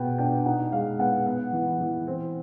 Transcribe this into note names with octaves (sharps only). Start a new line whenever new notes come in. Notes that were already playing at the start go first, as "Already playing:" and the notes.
Already playing: B2 B3 G5
D4 G5
D#4 F#5
G#3 F5
B3 F#5
B3
E3
E3
C4